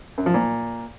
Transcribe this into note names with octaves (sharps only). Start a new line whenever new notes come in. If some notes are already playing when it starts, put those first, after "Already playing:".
F#2
F3
A#2